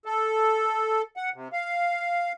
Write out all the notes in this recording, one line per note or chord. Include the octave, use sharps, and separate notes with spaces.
A4
F#5
C3
F5